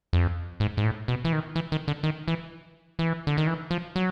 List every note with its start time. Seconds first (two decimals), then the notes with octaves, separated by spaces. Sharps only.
0.13 F2
0.60 G#2
0.77 G#2
0.84 A2
1.08 B2
1.25 E3
1.33 D#3
1.55 E3
1.72 D#3
1.88 D3
2.03 D#3
2.28 E3
2.99 E3
3.27 D3
3.37 D#3
3.47 E3
3.71 F3
3.96 F#3